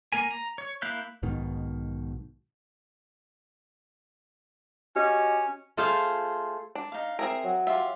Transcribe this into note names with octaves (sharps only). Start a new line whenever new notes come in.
A#3 A#4 G#5
A#5
C#5
A#3 E4 F5 F#6 G6
B1 G#2 B2 D#3
C#4 F#4 G4 D#5
A3 F4 G#4 A4 C5 F5
D4
D#4 F5
C4 G#4 A#4 E5
F#3
F4 G4 E5 C6